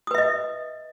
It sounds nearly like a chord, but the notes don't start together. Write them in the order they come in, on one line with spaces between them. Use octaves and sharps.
D#6 B4 E5 D#5